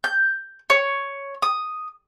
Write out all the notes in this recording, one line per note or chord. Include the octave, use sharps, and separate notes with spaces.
G6
C#5
D#6